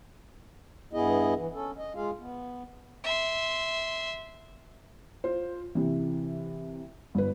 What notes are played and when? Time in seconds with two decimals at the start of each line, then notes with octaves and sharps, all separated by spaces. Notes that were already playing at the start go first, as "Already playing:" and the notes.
0.93 G2 B3 E4 G#4 D#5
1.36 E3
1.54 C#4 A4
1.78 D#5
1.95 G#3 F4 G#4 F5
2.20 B3
3.04 E5 C6
5.24 F4 C5
5.75 C3 E3
7.15 G1 B4